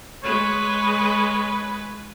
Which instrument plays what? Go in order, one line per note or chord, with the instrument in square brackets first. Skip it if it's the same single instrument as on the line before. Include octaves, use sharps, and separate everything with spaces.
[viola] G#3 B4 [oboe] C#5